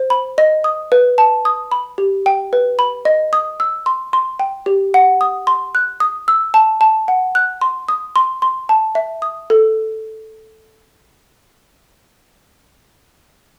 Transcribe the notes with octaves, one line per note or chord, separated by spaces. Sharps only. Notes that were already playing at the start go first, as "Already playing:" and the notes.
Already playing: C5
B5
D#5
D#6
B4
A5
D#6
B5
G4
G5
B4
B5
D#5
D#6
E6
C6
C6
G5
G4
F#5
D#6
C6
F#6
D#6
E6
A5
A5
F#5
F#6
C6
D#6
C6
C6
A5
E5
D#6
A4